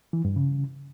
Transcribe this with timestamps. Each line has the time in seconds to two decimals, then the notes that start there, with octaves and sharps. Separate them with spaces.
0.13 E3
0.25 G2
0.36 C#3